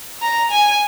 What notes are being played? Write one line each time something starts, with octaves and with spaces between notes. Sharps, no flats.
A#5
G#5